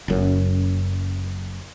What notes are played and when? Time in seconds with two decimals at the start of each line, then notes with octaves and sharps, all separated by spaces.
0.08 F#1 F#2